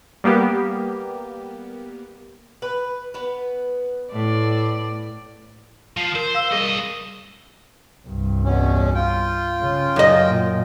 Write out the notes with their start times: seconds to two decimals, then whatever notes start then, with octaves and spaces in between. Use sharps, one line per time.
0.24 G3 A#3 B3 G4
2.62 B4
3.14 B3 B4
4.13 A2 D5
5.97 F3 C7 F7
6.15 A#4 C5
6.35 F5 E6
6.52 G2 G#4 A#4 D#5
6.66 E7
8.08 C2 G2
8.45 E2 B2 C#4
8.95 F4 G5
9.62 C#3
9.96 F#2 D#5
10.28 A#2